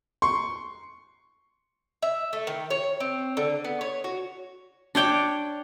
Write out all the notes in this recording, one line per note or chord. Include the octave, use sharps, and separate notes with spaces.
C6 C#6
E5
A3
D#3
C#5
C4
D3
B3
C#5
F#4
D4 C#5 G5 D6